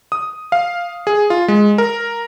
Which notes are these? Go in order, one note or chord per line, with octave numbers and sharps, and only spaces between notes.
D#6
F5
G#4
F4
G#3
A#4